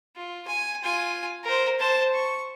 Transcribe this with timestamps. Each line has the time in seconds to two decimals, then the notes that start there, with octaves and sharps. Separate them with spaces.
0.16 F4
0.47 G#5
0.83 F4 G#5
1.44 A#4 C5
1.80 C5 A5
2.15 C#6